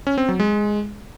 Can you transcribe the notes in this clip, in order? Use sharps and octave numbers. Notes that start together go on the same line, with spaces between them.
C#4
C4
F#3
G#3